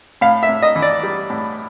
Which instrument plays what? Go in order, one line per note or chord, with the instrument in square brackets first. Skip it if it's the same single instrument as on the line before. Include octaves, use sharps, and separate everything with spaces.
[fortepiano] A2 F5
E5
A2
D#5
E3
D5
G3
A2